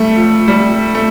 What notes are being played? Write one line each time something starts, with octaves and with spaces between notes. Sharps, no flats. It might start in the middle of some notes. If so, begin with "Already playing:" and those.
Already playing: G3 A3
F3
G3
A3